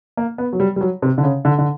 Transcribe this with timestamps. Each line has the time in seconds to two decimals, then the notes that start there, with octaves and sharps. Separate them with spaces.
0.17 A#3
0.38 B3
0.53 F#3
0.60 G3
0.76 G3
0.81 F#3
1.02 C3
1.18 D3
1.23 C#3
1.45 D3
1.59 D3